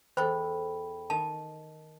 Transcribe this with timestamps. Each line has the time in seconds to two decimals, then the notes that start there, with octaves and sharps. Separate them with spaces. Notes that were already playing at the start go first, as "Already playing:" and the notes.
0.17 E2 A4 C5 G5 B5
1.10 D#3 A5